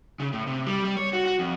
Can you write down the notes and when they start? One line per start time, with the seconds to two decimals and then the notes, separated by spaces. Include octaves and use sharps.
0.20 C#3
0.33 A2
0.47 C3
0.66 G3
0.84 G3
0.97 C#5
1.13 F#4
1.26 F#4
1.39 F2